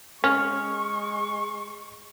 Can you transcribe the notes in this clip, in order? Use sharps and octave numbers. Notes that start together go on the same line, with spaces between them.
G#3 C#4 C#6 F6